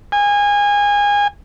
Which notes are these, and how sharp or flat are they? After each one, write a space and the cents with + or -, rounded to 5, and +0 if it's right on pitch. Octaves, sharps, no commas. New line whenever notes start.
G#5 -25